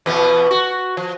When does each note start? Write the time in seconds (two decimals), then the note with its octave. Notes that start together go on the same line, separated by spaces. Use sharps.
0.06 E2 B2 B3
0.51 F#4
0.97 F3